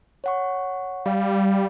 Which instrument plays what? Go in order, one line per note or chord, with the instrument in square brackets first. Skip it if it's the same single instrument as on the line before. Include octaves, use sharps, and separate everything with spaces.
[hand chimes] C#5 F#5 C#6
[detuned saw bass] G3 [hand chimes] F5